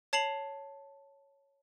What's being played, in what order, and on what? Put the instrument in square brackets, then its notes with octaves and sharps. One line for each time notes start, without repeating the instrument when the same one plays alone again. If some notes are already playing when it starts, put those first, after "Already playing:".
[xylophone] C#5 A5 C7 F7 F#7